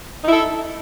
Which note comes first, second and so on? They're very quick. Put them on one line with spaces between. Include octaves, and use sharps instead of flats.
D#4 E4 A4